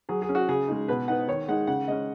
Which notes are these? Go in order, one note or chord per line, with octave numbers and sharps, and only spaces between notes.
F#3 G#4
G#4
C#4
F#4
C#3 G#4
G#3 D#4
B2 B4
B3 D#4 F#5
D#3 C#5
G#3 D#4 F#5
C#3 F#5
G#3 C#4 D#5